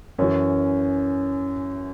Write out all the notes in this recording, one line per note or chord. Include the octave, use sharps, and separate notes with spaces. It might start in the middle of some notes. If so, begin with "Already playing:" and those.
F#2 E3 C#4